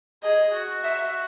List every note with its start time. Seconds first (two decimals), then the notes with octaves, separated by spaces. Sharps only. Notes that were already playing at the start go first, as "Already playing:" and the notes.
0.23 G#4 D#5
0.53 F#4
0.84 E5